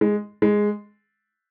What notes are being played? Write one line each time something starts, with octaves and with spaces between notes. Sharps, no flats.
G#3
G#3